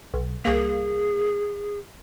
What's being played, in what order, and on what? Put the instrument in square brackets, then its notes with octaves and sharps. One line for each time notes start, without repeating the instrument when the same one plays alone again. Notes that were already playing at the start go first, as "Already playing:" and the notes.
[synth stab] B1
[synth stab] C2 A#3 [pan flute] G#4